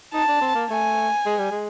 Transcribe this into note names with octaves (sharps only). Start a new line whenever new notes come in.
D#4 A5
D4
C4
A#3
A3 G#5
G#3
G3
G#3